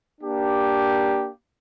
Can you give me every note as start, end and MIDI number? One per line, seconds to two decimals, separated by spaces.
0.21 1.30 58
0.21 1.30 62
0.21 1.30 67